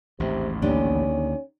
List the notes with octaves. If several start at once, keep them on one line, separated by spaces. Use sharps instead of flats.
A1 D#2 G#2 C3
D2 D#3 A#3 C#4 D4 G4